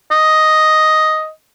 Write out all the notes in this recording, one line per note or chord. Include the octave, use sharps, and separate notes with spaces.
D#5